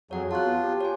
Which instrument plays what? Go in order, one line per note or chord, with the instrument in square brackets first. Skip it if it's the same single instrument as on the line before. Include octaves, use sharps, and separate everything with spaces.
[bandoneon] F2 F#3 [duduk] G#4 [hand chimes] C#5 F#5
[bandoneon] F4 [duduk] F#4 [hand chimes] A5 F#6
[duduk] B3
G4
[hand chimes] C#5 G#5